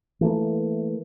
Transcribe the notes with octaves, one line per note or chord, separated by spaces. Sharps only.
E3 A3 A#3